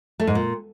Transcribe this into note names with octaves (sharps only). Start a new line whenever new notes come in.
A3
G#2
A#2